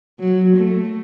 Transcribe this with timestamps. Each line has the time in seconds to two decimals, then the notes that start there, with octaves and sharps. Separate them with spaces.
0.20 F#3
0.56 A3